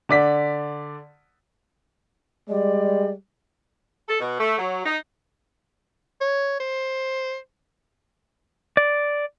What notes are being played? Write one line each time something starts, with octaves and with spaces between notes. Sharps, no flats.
D3 D5 B6
G3 G#3 D5
A4
B2
A3
F#3
D#4
C#5
C5
D5